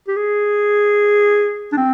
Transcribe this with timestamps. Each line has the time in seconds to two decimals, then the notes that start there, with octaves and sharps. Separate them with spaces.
0.08 G4
0.16 G#4
1.72 D4
1.77 C4